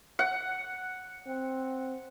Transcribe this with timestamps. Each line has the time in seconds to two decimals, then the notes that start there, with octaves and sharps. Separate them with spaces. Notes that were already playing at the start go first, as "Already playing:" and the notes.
0.19 F#5
1.27 C4